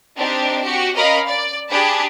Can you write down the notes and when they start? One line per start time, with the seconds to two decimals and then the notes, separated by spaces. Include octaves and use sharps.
0.17 C4 D4 D#4 G4
0.62 F#4 G4
0.95 C#4 A#4 D#5 F5 B5
1.27 D5
1.70 D4 G4 G#4 A5 B5